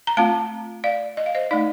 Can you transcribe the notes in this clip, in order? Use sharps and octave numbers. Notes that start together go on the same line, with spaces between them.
A#5
A3 C4 F4 F5 A5
D5 F5
D#5
F5
C5 D#5
A3 D#4 D5 F5